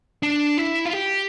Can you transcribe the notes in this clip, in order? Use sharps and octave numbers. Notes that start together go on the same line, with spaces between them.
D4
E4
F4
G4